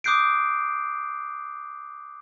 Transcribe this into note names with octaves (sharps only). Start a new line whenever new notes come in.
D6 D#6 F#6 G6 C7 D7